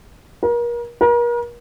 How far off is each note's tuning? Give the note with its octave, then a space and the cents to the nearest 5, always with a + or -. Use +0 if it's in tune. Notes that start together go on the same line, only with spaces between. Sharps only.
A#4 +35
A#4 +40